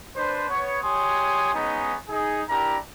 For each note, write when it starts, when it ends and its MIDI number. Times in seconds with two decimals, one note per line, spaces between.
0.17 0.49 62
0.17 0.49 71
0.17 0.49 72
0.49 0.78 59
0.49 0.78 73
0.82 1.52 67
0.82 1.52 73
0.82 1.52 80
0.82 1.52 84
0.82 1.52 87
1.54 1.94 56
1.54 1.94 59
1.54 1.94 61
1.54 1.94 63
2.09 2.43 63
2.09 2.43 68
2.49 2.76 62
2.49 2.76 64
2.49 2.76 67
2.49 2.76 70
2.49 2.76 82